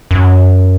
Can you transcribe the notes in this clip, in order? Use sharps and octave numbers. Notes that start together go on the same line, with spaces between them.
F#2